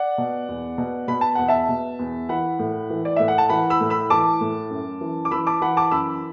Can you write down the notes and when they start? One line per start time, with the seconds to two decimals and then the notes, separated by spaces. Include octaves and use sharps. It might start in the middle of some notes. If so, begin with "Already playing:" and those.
Already playing: D5 F#5
0.18 B2
0.49 E2
0.78 B2
1.08 B2 B5
1.21 A5
1.35 E2 F#5
1.48 E5 A5
1.69 B2
1.99 E2
2.29 E3 F#5 B5
2.59 A2
2.90 E3
3.05 D5
3.16 A2 E5
3.28 F#5
3.38 A5
3.49 E3 F#5 B5
3.70 B5 E6
3.80 A2
3.90 B5 E6
4.10 E3 A5 D6
4.41 A2
4.70 F#2
5.01 E3
5.25 D6
5.31 E3 B5 E6
5.47 A5 D6
5.61 E3 F#5 B5
5.77 A5 D6
5.91 F#2 B5 E6